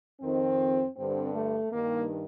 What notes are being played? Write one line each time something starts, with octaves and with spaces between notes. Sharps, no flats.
F2 D#3 C4
G2 D3 C4
A3
G2 D#3 A#3